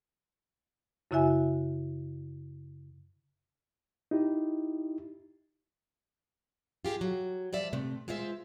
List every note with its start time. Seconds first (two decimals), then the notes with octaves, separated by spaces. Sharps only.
1.11 F#2 C#3 E4 F#4 E5 G#5
4.11 D#4 E4 G4
6.85 F4 G4 G#4
7.01 F#3
7.53 F3 G3 D5 E5
7.73 C3 A3
8.08 G#3 F4 C5 D#5 E5